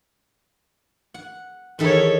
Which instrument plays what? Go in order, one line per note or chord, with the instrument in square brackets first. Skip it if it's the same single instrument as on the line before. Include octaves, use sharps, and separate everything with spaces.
[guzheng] F#5
[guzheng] E2 D#3 E5 [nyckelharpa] A4 C#5